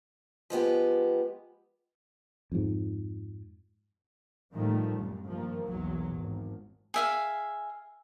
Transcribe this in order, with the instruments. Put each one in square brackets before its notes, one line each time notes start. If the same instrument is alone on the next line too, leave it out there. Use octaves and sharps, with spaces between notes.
[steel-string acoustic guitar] F3 G#3 B3 G4
[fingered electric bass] F2 G#2
[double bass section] A2 D#3 F3 G3 A3
C2 F#2 A#2
G2 D#3 F3 A#3
B1 E2 F#3
G#1
[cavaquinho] G#4 E5 F5